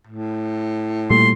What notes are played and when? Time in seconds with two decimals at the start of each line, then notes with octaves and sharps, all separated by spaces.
0.07 A2
1.11 A#2 G3 A3 C6